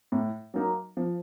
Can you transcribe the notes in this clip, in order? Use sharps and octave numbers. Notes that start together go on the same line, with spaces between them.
A2
F#3 A#3 D#4
F3